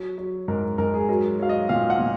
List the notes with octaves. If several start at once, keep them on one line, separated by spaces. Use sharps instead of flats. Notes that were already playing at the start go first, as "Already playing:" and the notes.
Already playing: F#3
F#3
G#2 A#4
G#2 A#4
G#4
F#3 A#4
F#3 F5
D#5
A#2 F5
F#5
A#2